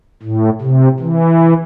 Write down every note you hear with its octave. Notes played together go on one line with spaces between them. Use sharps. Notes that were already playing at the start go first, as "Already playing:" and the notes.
A2
C3
E3